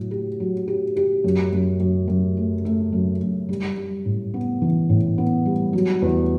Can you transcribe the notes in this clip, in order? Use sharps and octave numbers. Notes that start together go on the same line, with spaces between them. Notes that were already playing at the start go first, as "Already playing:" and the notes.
Already playing: A2 F#3
G4
F#3
G4
G4
F#2
F#2
F#2
F#2
A3
A3
F#2
F#2
G3
G3
A2
B3
E3
A2
B3
G3
F#3
E2